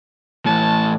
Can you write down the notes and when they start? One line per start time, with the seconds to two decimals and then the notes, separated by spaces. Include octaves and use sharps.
0.46 A2 E3 A5